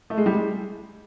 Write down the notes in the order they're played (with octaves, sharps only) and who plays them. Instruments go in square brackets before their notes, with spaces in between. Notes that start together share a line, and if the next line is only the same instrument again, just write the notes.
[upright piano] A3
G#3
G3
G#3